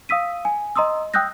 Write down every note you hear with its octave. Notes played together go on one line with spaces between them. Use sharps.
F5 D#6 E6 B6 D#7
G#5
D#5 A#5 C6 D#6 E6
G5 D#6 E6 F#6 G6 A#6